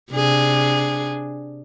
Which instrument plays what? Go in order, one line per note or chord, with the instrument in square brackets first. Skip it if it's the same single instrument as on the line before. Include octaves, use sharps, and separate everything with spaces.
[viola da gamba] C3 D4 G#4